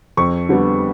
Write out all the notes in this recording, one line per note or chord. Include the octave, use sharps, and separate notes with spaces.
F2 C#6
D3 G3 B3